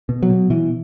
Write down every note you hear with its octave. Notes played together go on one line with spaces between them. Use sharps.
B2
F#3
B2
B2 E3